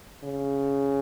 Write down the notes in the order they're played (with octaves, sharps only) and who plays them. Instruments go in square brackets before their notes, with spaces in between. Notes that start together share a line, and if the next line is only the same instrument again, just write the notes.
[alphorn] C#3